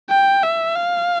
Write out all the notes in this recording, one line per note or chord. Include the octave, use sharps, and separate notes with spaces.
G5
E5
F5